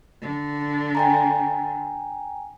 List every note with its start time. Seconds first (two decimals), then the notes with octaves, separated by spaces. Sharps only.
0.22 D3
0.95 G5 G#5 A#5